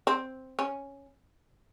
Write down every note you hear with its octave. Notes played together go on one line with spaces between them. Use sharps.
C4
C#4